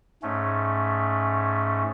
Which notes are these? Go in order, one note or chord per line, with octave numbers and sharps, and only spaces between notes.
G#2 A3 C#4